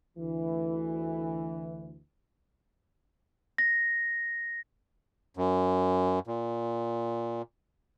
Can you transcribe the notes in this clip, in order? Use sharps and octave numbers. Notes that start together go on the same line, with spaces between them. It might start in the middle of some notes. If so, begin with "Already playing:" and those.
D2 E3
A#6
F#2
A#2